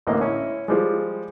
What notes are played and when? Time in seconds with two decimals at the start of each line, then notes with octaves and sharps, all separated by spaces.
0.07 A1 D2 A#3 D#5
0.21 C#4 E4
0.68 F3 G3 G#3